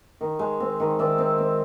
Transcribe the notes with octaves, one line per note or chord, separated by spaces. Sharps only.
D#3
G#3
C4
D#3
D#3 D5 E5
C4
C4